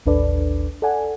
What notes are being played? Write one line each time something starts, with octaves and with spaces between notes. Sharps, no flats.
A1 D#2 D4 A4 B4 D5
A4 D5 F#5 G#5